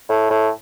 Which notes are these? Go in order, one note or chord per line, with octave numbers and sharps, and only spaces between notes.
A2
A2